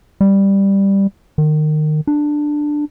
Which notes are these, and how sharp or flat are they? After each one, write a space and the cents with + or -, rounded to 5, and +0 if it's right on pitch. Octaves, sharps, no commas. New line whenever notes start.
G3 +5
D#3 -25
D4 +10